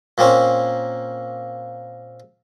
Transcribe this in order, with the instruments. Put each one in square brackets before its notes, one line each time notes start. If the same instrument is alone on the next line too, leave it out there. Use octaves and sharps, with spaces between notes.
[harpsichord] A#2 A#3 C4 C#4